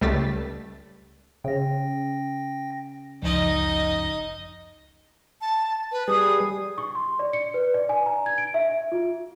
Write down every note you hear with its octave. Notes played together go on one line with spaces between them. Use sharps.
C#2 G3 A3 A6 B6
C#3 G5 A#6
G1 C#2 F#2 F3 D#4 D#5
A5
B4
G3 G#4 D#6
C#6
C6
D5
C#7
B4
D5
G#5
A#5
G#6
D7
E5
F4